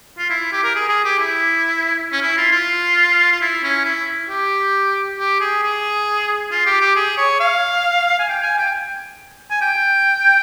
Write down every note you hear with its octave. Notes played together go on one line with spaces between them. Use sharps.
F4
E4
G4
A#4
G#4
G#4
G4
E4
C#4
E4
F4
F4
F4
E4
C#4
E4
G4
G4
G#4
G#4
F4
G4
G4
G#4
C#5
F5
G#5
G5
G#5
G5
G#5
G5